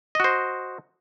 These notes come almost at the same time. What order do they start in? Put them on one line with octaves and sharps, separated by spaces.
D#5 F#4 C5